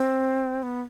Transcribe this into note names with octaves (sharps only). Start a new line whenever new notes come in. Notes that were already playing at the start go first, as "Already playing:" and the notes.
Already playing: C4
B3